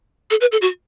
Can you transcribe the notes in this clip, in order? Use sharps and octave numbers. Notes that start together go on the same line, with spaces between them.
A4
B4
A4
F#4